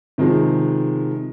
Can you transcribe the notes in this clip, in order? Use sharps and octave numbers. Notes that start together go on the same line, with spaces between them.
C3 D#3 F3 G#3